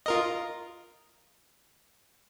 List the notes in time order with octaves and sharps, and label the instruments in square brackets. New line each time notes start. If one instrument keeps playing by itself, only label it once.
[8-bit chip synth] F4 A#4 D#5